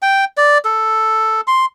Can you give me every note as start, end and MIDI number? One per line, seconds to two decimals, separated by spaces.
0.02 0.25 79
0.37 0.58 74
0.65 1.41 69
1.48 1.66 84